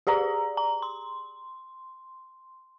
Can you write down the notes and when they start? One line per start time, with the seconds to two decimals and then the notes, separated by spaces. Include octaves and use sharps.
0.07 G4 G#4 D5 A#5
0.57 A#5
0.82 C6